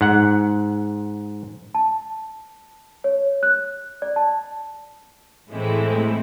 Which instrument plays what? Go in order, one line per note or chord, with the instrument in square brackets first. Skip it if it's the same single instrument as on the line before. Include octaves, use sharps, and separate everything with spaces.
[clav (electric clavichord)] G#2 F#5
[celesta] A5
C#5
F#6
D5
A5
[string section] A2 E3 G#3 A3 C4 E4